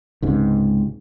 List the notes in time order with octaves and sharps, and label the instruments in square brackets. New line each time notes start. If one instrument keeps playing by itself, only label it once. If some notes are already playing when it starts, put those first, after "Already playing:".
[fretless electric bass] C#2 G#2 C3